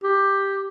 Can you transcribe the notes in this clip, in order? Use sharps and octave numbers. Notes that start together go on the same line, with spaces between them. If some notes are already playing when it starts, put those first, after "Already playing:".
G4